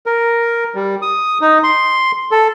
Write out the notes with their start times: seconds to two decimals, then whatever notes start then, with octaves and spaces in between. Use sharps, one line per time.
0.06 A#4
0.75 G3
1.02 D#6
1.41 D#4
1.64 C6
2.31 A4